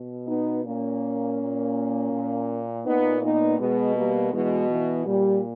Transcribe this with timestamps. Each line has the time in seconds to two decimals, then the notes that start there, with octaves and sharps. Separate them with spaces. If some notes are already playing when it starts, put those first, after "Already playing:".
Already playing: B2
0.27 B3 D#4
0.64 A#2 A#3 C#4
1.39 A#2
2.11 A#2
2.85 A#2 B3 D#4
3.22 B3 D#4
3.59 B2 G#3 B3
3.96 G3 A#3
4.32 B2 E3 G#3
4.69 E3
5.06 A#2 G3